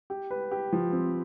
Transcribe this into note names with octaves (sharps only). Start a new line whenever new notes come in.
G4
B4
G4
F3
C4